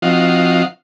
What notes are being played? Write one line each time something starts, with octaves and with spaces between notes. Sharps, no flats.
F3 C4 D#4 F4 F#4